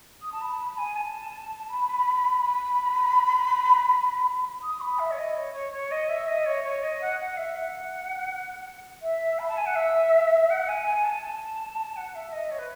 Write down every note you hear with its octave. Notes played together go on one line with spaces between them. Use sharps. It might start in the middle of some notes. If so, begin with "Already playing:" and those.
D#6
A5
B5
A5
B5
G#5
A5
B5
B5
D#6
B5
E5
C#5
D#5
C#5
C#5
C#5
D#5
E5
D#5
C#5
C#5
D#5
F#5
F#5
E5
F#5
E5
B5
A5
G#5
F#5
E5
F#5
G#5
G#5
A5
A5
F#5
E5
D#5
C#5
B4